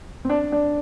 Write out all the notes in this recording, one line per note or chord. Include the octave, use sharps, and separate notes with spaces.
C4
D4
D4